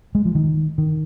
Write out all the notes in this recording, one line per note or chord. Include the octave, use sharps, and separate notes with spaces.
G#3
F3
D#3
D#3